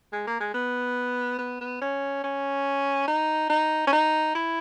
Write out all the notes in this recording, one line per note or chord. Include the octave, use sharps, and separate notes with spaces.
G#3
A#3
G#3
B3
B3
B3
C#4
C#4
D#4
D#4
C#4
D#4
E4